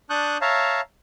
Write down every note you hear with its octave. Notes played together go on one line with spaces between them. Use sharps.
D4 A5 C#6 D#6 F#6 G6
C#5 E5 F5 A5 A#5